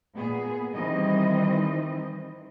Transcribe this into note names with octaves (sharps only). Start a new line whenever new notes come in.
A#2 B3 G#4
D#3 E3 G3 C4 D#5